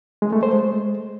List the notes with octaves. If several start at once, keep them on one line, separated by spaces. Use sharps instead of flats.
G#3
A3
C5
G#3